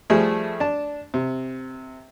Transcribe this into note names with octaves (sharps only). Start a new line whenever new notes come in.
F3 G3 A3 G#4
D4 A5
C3